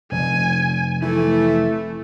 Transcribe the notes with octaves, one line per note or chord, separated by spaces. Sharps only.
F1 G#5
E3 A3